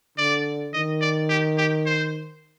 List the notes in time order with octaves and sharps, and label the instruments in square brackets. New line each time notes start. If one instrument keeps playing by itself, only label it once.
[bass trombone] D3 [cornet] D5
[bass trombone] D#3 [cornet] D#5
[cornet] D5
G4
G4
C5